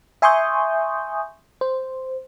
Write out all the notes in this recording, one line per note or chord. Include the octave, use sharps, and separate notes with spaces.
E5 G#5 C6 C#6 D#6 G6
C5